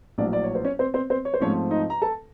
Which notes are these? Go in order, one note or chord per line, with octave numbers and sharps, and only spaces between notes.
A#1 A2 F#3 D4 D5
D5
C#5
C5
C#4 C#5
C4 C5
C4 C5
C4 C5
C#5
C5
G#2 F3 A3 C4 C#4 C#5
D#4 D#5
A#5
A4 A5